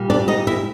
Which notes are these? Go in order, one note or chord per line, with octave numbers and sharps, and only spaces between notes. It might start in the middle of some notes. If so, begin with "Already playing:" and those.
Already playing: A#2 G3
D4 D5
D#4 D#5
E4 E5